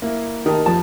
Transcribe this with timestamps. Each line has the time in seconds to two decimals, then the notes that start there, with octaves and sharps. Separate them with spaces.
0.02 A#3 E4
0.46 D#3 D#4 G4 A5
0.66 F2 F3 A5